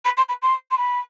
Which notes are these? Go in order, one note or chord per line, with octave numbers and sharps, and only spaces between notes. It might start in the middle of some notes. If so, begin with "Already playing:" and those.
B5
C6
B5
C6
C6
B5